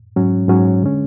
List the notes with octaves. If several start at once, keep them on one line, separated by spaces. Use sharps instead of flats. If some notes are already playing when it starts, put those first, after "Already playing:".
G#2 F#3 C#4
G#2 F#3 C#4
D3 G#3 C#4